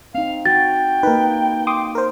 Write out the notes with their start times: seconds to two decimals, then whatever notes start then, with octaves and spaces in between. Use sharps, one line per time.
0.15 C4 D#4 F5
0.46 F#4 G5 A6
1.03 A#3 D#4 A#4 B4
1.67 C6 D6 D#6
1.95 A#4 C5